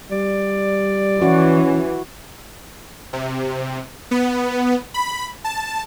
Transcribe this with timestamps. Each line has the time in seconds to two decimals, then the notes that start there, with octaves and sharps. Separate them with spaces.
0.12 G3 D5
1.22 E3 C#4 F#4
3.13 C3
4.11 B3
4.94 B5
5.44 A5